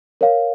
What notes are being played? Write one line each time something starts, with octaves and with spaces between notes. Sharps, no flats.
A#4 C#5 F5